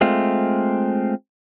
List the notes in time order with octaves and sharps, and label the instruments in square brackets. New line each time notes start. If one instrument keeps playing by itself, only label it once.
[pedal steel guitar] G#3 A3 C4 F4